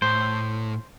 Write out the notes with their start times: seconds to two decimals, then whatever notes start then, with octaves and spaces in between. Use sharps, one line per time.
0.02 A2 C5